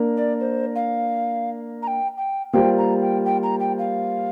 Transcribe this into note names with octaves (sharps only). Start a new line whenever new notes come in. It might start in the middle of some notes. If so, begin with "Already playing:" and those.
Already playing: A#3 D4 A#4
D5
C5
F5
A#5
G5
G5
G3 A#3 F4 C5 G5
A#5
G5
G5
A#5
G5
F5